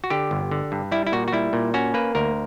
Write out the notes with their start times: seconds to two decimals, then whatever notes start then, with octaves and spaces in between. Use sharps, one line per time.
0.04 F#4
0.10 D3 G4
0.31 G1
0.51 D3
0.72 G2
0.92 G3 E4
1.07 E4
1.12 A#2 F#4
1.28 F#4
1.33 G3 E4
1.53 A#2
1.74 C#4 F#4
1.94 A#3 B4
2.15 D2 A#4